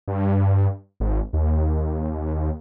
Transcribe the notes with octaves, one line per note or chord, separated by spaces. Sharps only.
G2
G#1
D#2